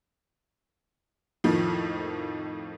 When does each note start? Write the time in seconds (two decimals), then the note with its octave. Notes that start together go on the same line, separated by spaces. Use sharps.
1.44 F2 A2 D#3 F3